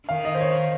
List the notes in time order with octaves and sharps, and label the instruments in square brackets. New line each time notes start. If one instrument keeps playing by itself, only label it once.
[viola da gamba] D#3 [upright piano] F5
[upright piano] D#5
C5
C#5